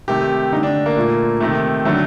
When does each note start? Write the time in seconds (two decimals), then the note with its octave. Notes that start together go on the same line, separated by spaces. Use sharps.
0.08 C3 D#3 A3 G4
0.52 D3 A3 D#4
0.63 D4
0.86 A#3
0.97 A#2 A3
1.40 C3 D#3 A3
1.85 D3 F#3 A3